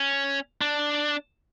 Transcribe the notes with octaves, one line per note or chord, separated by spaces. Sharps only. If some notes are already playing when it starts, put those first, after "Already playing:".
Already playing: C#4
D4